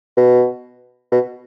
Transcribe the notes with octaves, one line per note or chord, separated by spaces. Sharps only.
B2
B2